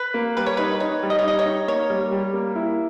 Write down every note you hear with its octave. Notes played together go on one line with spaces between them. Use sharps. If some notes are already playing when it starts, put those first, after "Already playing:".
Already playing: B4
A#3
G3 B4
C#5
D#4 B4
D#4 C#5
G3
D#5
C#5
D#4 D#5
C#5
D#4
A#3 C#5
G3
G3
A#3
E4